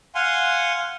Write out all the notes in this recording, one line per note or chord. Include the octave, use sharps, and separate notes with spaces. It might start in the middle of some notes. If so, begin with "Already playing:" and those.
F5 F#5 G#5 C6